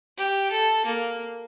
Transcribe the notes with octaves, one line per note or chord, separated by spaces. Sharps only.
G4
A4
A#3